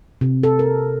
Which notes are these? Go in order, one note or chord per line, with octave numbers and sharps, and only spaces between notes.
C3
A4
A#4